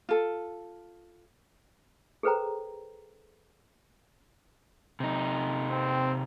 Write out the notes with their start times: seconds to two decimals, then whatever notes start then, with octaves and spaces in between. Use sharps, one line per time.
0.09 F4 A4
2.23 G#4 A4 B4 C5 G5 A#5
5.00 C3 D#4
5.70 C4